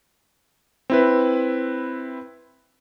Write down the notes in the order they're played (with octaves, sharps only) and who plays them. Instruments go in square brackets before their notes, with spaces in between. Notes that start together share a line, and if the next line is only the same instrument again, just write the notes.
[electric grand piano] C4 E4 B4